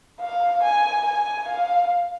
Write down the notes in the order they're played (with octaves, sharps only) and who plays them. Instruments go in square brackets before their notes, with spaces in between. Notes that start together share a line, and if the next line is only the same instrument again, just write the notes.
[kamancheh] F5
G#5
G#5
F5